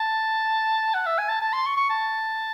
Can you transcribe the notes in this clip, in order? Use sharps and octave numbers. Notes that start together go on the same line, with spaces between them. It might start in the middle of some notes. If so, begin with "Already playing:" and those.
Already playing: A5
F#5
E5
G#5
A5
A5
C6
C#6
C#6
A5